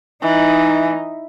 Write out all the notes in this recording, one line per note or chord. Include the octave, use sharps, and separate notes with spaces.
E3 D#4